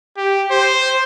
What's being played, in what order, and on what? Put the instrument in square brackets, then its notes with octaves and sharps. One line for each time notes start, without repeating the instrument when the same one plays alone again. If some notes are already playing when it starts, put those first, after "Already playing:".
[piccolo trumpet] G4
C5